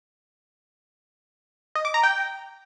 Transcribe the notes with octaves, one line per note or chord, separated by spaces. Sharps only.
D#5
D6
A#5
G5